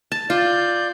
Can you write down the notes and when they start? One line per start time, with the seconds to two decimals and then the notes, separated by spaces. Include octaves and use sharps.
0.12 A5
0.30 F4 D5 G6